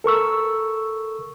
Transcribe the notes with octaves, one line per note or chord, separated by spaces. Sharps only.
A4 A#4 C#6 E6